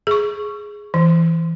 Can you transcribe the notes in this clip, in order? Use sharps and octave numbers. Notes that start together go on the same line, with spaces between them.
G#4 C#6
E3